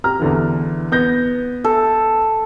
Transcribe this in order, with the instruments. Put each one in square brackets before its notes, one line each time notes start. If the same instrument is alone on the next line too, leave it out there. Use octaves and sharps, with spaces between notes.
[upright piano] G4 A#5 F6
E2 D3 E3
B3 G6 A#6
[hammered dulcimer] A4